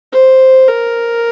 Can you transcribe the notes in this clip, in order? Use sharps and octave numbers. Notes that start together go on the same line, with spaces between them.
C5
A#4